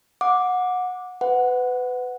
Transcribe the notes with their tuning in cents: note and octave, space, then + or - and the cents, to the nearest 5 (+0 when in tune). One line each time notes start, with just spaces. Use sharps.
F#5 -25 D6 +0
B4 +25 F#5 +0